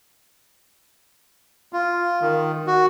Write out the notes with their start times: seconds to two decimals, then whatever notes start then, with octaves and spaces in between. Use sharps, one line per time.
1.73 F4
2.21 D#3
2.67 F#4